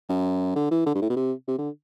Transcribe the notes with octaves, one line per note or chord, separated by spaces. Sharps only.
F#2
D3
E3
D3
G2
A2
B2
C3
C3
D3